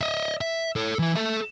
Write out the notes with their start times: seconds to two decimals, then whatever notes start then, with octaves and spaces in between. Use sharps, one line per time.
0.01 D#5 E5
0.41 E5
0.76 A4 C#5
0.99 E3 E4
1.15 A4 E5